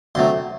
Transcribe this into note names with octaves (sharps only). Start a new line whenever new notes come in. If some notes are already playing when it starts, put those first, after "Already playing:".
D2 C3 F#3 A3 C6